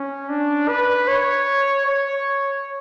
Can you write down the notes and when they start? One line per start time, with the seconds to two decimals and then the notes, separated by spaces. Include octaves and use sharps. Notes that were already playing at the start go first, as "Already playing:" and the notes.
Already playing: C#4
0.29 D4
0.68 B4
1.08 C#5
1.86 C#5